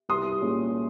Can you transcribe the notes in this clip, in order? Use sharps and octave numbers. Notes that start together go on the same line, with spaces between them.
C2 C6 D#6
A#2 G#3 C#4